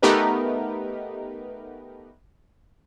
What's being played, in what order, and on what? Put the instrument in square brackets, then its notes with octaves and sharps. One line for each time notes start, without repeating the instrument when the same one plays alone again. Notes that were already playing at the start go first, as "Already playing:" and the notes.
[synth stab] A3 B3 D#4 G4 A#4 B4